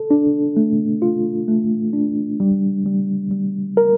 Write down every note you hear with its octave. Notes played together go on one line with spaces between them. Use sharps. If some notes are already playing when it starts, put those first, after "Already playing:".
Already playing: A4
D4
A3
F4
A3
D4
G3
G3
G3
A#4